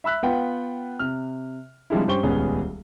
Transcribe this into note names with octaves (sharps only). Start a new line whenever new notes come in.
E5 B5 E6 F#6 B6
B3 F4 B4 F#5 G5
C3 F6
C3 F3 G3 G#3 D4 E4
G2 C#4 G4 C5 C#6 G7
D#1 C#2 C#3 B3 C#4 G#4